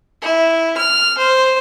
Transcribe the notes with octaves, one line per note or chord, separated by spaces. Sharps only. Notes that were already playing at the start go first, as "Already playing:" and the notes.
E4
F6
C5